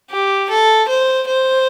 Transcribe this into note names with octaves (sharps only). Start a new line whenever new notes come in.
G4
A4
C5
C5